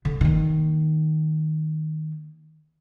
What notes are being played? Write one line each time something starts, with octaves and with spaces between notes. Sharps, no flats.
D3
D#3 A#3